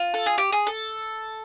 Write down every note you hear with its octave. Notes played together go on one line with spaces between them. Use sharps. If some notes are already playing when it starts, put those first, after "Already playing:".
Already playing: F4
A4
G#4
G4
G#4
A4